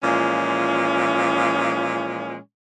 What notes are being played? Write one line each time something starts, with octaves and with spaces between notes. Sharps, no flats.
A#2 E3 F3 G#3 C#4